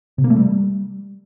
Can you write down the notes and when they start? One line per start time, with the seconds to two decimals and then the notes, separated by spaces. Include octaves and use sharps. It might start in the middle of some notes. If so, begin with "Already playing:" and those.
0.18 C3
0.24 A#3
0.30 A3
0.36 G3